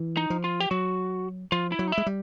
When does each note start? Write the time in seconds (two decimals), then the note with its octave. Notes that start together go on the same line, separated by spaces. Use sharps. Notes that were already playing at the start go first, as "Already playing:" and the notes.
Already playing: E3
0.17 D#4
0.30 F3
0.44 F4
0.60 G4
0.71 F#3 F#4
1.52 F3 F4
1.72 E4
1.79 F#3
1.87 D#4
1.92 E4
1.98 G#3
2.06 G3